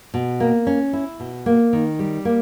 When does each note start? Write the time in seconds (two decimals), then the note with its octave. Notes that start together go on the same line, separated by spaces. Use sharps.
0.14 B2
0.40 A#3
0.67 C#4
0.93 E4
1.20 B2
1.46 A#3
1.73 D#3
1.99 G3
2.25 A#3